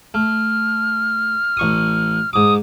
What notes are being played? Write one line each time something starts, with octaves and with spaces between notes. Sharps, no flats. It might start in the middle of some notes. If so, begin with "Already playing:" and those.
A3 F6
A1 C#6 D#6
G#2 D6 D#6